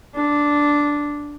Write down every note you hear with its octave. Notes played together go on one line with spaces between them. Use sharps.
D4